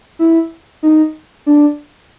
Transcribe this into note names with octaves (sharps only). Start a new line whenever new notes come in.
E4
D#4
D4